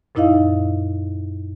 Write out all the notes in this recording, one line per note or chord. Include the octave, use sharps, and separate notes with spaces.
F#2 A#2 D#4 E4 D#5 F5